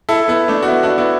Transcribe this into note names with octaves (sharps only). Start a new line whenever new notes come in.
E4 A4
B3 E4
A3 D4
F#4
B3 E4
D4 F#4
B3 E4